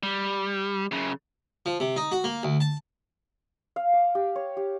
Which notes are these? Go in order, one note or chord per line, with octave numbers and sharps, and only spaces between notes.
G3
F#2 C#3
F3
C3
D#4
F#4
A#3
D2
A5
F5
D6
G4
C#5
G4